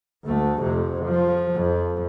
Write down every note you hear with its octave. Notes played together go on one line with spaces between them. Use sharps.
D2 A3
F2 C3
F3
F2